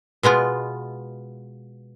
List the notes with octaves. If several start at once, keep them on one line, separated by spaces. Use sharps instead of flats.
B2 G#3 B3 F4